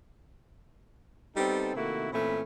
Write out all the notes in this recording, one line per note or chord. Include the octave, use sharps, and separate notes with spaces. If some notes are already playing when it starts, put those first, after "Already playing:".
G3 B3 C4 D#4 A4
C3 D#3 A3 A#3 E4 F#4
A#2 E3 A3 C4 C#4 B5